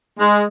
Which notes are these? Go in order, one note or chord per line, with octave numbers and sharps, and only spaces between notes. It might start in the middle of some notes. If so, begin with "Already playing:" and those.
G#3